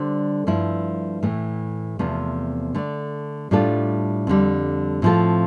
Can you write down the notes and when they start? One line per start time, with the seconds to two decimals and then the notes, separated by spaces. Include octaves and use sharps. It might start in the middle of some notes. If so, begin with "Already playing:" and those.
Already playing: D3 G3 D4 A4 C5
0.47 G2 F3 A3 E4
1.23 A2 E3 A3
1.99 E2 C3 F3 A3
2.75 D3 A3 D4
3.51 A2 G3 D4 F4 A4
4.27 F2 D3 G3
5.02 A2 F3 C4 F4 A4